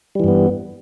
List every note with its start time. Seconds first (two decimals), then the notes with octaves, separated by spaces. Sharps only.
0.15 G3
0.20 E3
0.24 G2
0.28 B3